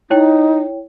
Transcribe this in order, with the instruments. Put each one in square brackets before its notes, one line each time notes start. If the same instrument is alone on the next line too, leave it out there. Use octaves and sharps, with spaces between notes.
[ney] D#4 [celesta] E4 C#5 G5